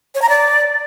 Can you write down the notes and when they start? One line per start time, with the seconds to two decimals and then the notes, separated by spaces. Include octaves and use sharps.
0.15 C#5
0.22 A#5
0.29 D5